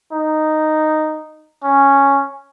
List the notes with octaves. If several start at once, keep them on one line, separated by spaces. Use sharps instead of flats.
D#4
C#4